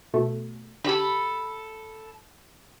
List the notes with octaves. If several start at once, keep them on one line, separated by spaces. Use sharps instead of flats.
B2 A3
D3 G4 A4 B5